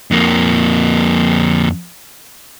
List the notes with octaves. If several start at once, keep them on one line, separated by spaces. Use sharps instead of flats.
F2 A#3